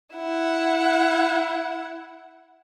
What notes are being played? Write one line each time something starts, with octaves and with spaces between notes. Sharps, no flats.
E4 F#5